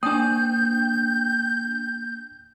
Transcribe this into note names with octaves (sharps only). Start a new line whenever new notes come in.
A#3 D4 D5 G5 G#5 D#6 G6